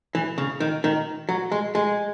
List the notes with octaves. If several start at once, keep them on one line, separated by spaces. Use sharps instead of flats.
E3
C#3
D#3
D#3
F#3
G#3
G#3